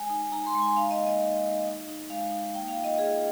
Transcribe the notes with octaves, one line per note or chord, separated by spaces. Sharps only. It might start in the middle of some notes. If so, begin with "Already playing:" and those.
Already playing: G#3 G#5
D#4
D#4 A#5
C6
G#3
G#5
D#4 F5
D#5
A#3
D#5
D#4
D#4
D#4
D#4
G#3 F5
D#4
A#3 G5
F5
F4
D#5
F4 G#4